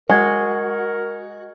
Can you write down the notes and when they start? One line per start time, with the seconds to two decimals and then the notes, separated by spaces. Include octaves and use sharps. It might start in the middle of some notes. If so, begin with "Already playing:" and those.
0.09 G#3 F#4 A#4 G#5 G#6